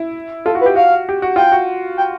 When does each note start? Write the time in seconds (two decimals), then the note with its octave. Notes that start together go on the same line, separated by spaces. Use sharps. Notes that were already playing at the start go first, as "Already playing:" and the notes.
Already playing: E4
0.45 F4 A4
0.55 F#4
0.61 B4
0.66 G4
0.76 F#4 F5
1.09 G4
1.22 F#4
1.36 F4 G5
1.52 F#4
1.97 G5